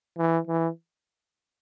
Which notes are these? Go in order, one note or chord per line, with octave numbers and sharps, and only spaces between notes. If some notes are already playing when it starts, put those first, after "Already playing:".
E3
E3